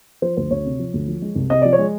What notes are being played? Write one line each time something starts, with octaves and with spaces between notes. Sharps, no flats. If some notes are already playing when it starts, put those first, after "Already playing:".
F3 C5
D2 C5
D2 C#5
C3
F3
D2
F3
G#3
C2
C3 D#5
F3 D5
C#5
G#3